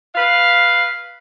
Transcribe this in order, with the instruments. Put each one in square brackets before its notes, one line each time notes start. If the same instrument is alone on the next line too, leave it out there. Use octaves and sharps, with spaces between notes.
[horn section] B4 F5